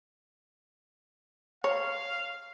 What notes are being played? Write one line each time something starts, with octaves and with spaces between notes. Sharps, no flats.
C#5 F5